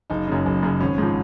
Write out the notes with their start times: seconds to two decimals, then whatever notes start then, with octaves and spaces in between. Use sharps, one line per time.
0.10 F#1 D#4
0.28 F#2 C#3
0.46 F#1
0.63 F#2 C#3
0.81 G#1 C#4
0.98 G#2 F3